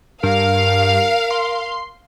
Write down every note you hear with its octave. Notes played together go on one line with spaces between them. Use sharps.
G2 A#4 F5
C6